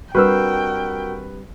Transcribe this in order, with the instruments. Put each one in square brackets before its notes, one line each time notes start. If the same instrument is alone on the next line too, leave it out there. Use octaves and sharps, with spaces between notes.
[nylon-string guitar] G3 C4 D4 [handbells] F#4 A#4 E6 [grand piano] B4 [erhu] G5